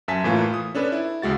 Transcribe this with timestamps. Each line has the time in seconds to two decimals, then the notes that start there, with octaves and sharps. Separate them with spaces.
0.08 F#2 E5 G#5 A5 B6
0.24 A2 E3 A#3 F4
0.54 D#6
0.75 C#4 D4 A4 B4
0.92 E4
1.22 C#2 G#3 F#4 A6